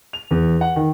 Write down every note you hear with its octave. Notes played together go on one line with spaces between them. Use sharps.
F7
E2
F#5
D#3